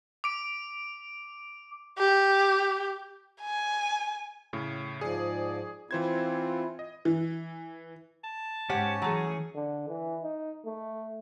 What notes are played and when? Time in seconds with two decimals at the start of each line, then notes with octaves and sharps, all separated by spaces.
0.24 D6 D7
1.98 G4
3.41 G#5
4.53 A2 C#3
5.01 G#2 F3 G#4 D5
5.91 E3 C4 E4 F4 C5 G#6
6.79 D#5
7.05 E3
8.24 A5
8.70 G#2 C#4 G4 C5 C#5 F#5
9.02 E3 F#3 A3 G#4
9.55 D3
9.89 E3
10.23 D#4
10.66 A3